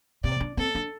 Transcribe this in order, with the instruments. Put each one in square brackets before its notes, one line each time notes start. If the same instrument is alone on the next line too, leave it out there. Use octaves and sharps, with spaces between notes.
[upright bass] C3 [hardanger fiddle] D5
[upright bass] D4
[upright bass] C4 [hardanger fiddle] A4
[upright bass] D4